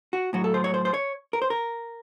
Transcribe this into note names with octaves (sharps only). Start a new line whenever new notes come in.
F#4
A2 F#3 F#4
A4
C5
C#5
C5
C5
C#5
A#4
C5
A#4